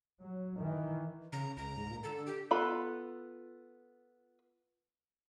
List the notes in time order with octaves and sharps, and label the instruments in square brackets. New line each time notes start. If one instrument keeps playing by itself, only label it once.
[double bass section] F#3
D#3 E3
[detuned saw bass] C#3 [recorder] A#5
[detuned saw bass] C#2 [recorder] A#5
[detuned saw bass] G#2
A#2
[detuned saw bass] D3 [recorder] A4
[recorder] G4
[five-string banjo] B3 F4 A4 B5